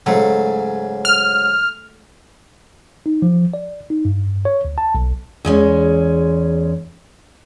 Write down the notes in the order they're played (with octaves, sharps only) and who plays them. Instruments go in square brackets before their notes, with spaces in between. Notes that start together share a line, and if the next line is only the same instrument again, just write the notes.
[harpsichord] G#2 C#3 F#3 [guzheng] A3
[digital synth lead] F6
[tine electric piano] D#4
F3
D5
D#4
G2
C#5
D2
A5
B1
[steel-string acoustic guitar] E2 G#3 C#4